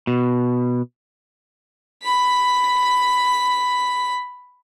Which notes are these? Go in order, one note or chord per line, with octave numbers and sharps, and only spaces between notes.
B2
B5 B6